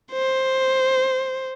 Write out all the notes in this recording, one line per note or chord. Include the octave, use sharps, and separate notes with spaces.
C5